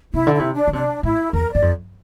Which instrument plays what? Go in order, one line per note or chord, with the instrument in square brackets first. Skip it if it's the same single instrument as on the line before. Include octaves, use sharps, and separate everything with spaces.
[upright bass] C3 [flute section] E4
[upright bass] D3
[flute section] E4
[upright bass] C3
[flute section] D4
[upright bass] D3
[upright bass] C3 [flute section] D4
[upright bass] A2 [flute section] E4
[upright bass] E2 [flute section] A#4
[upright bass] G2 [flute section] D5
[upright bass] F2